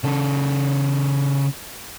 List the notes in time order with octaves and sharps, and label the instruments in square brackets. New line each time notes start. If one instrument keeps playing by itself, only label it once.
[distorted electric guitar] C#3 A4